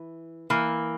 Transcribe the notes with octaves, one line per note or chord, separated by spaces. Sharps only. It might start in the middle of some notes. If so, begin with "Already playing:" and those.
Already playing: E3
E3 A#3